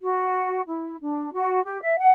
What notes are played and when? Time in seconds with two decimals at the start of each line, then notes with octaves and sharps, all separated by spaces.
0.02 F#4
0.67 E4
1.01 D4
1.34 F#4
1.65 G4
1.82 E5
1.98 F#5